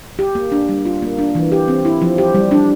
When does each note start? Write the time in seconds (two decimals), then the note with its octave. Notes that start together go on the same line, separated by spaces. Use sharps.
0.19 G4
0.35 A#3
0.52 D4
0.69 G3
0.85 F4
1.02 A#3
1.18 D4
1.35 E3
1.52 G4
1.68 C4
1.85 E4
2.02 F3
2.18 G4
2.35 G3
2.51 D4